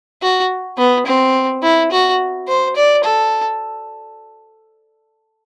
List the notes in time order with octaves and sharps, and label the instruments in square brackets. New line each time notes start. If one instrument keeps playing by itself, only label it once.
[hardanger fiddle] F#4
B3
C4
E4
F#4
C5
D5
A4